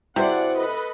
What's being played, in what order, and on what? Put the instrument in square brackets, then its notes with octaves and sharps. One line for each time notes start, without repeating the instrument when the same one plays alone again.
[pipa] C3 [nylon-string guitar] E4 F#4 C5 [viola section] G#4 D5 F#5
[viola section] A4 B4 D#5